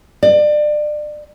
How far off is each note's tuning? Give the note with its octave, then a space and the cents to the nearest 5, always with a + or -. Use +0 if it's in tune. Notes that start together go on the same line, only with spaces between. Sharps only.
D5 +30